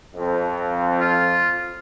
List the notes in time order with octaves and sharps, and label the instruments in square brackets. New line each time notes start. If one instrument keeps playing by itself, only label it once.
[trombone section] F2
[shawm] F4